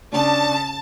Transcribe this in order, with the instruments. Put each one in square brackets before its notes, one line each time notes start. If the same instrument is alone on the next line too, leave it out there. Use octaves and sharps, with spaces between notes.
[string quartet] C#3 [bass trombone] D4 [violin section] A5